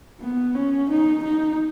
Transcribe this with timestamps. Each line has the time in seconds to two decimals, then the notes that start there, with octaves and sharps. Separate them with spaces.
0.21 B3
0.55 C#4
0.90 D#4
1.24 D#4